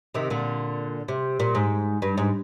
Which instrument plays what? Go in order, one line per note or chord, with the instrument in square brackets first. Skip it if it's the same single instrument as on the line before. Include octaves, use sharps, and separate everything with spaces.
[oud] C3 D#3
A#2 D3
C3
A#2
G#2
G2
G#2